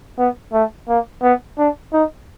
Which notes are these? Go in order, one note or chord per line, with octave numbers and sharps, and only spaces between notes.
B3
A3
A#3
B3
D4
D#4